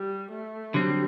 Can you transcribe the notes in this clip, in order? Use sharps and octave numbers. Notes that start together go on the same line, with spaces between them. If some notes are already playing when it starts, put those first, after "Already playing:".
Already playing: G3
A3
D3 F#3 G3 C4